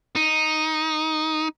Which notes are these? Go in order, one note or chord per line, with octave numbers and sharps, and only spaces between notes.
D#4